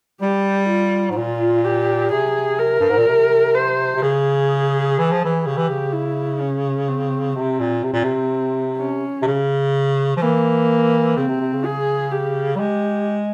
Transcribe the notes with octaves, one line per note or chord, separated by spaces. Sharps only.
G3 G4
F4
G#2
A#2 F4
G4
C3 G#4
A#4
G2
G#2
A#2
C3
C5
C3
C#3 G#4
E3
F3
E3
C#3 G4
E3
C#3
E4
C#4
C4
C3 C4
A#2
C3 C4
A#2
C3
C#4
C3
C#3
F3
E3 A#3
C#3 C4
C3
C3
C#3
G#4
G4
G3
G#3 G4